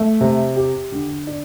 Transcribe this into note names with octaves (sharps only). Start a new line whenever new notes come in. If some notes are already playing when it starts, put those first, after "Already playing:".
Already playing: A3
C3
G4
D3
D4